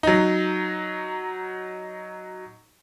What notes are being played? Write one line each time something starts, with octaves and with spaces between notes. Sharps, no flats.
F#3 D#4